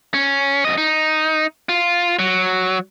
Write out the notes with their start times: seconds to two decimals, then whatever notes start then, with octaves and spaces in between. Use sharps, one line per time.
0.14 C#4
0.65 F#2 D#5
0.78 D#4
1.69 F4
2.19 F#3